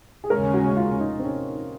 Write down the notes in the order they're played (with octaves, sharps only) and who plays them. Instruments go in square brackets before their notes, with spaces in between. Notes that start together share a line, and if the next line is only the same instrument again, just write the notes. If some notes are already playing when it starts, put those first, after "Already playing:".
[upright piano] G#4
[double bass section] D#2 C#3 G#3 C#4 [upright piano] A#4
[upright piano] F#4
F4
D#4
C4
C#4